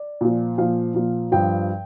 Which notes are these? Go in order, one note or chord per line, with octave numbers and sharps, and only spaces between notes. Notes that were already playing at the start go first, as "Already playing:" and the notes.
Already playing: D5
A#2 F3
A#2 F3 F5
A#2 F3
G2 F3 G5